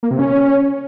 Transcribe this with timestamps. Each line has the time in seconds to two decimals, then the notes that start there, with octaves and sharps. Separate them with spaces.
0.03 A#3
0.11 C3
0.19 C#4